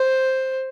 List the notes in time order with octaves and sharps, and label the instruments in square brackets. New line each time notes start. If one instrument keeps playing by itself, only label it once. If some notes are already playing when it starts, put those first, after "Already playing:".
Already playing: [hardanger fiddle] C5